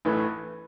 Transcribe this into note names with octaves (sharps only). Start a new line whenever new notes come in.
A1 A2 E3 A3 B4